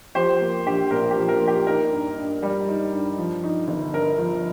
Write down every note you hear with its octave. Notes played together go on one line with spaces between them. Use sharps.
F3 G4 C5
A#3
A#1 G4
A#2 A#4
G4
F3
A#4
A#3
G4
D#4 A#4
G2
G2
G3
D#4
G2
F3
D#4
G1
G2 A#4
F3